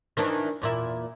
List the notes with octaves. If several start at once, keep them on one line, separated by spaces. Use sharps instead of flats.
D#3 E3 D4
E2 A#2 E4